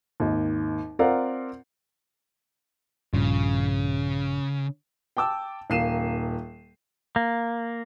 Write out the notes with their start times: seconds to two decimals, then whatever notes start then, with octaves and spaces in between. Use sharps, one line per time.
0.20 G#1 D#2
0.99 C4 F4 A#4 D5 F5 F#5
3.13 A#1 G2 C#3 F3
5.17 G5 A5 D6 E6
5.70 D#1 A#3 C7 D#7 E7
7.16 A#3